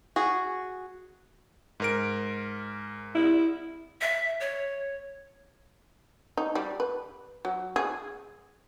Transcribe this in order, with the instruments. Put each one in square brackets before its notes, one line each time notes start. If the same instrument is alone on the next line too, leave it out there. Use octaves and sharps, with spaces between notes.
[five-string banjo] F#4 G#4
[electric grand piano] G#2 A#4 D7
[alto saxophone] E4
[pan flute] E5
C#5
[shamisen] D#4
G3
B4
F#3
G#4